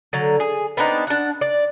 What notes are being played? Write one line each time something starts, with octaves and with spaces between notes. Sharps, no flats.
D3 F#3
G#4
B3 C4 D4 D#4
D4 F#5
D5